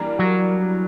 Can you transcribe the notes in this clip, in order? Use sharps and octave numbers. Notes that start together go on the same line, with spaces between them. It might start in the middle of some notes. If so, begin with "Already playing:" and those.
Already playing: E3 G3 A#3 D4 A#4
F#3